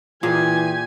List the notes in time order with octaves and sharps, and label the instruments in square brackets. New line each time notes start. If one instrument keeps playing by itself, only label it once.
[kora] A#2 G#4 [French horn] E3 [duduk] G4 [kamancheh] G#5